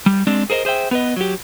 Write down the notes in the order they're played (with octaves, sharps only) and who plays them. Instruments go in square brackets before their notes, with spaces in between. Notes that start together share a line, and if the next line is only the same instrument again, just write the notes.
[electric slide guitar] G3
G#3 C4 D4
G#4 A#4 C5 C#5 D#5
G#4 C5 E5 G5
B3 B4 D#5
F#3 G4